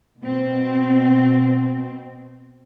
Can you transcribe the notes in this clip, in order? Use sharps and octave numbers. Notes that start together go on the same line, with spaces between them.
B2 C4